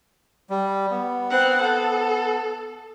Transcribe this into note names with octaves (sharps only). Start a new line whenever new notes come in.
G3
B3
C4 F#5
A4